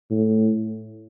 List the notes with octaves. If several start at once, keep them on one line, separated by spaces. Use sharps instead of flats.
A2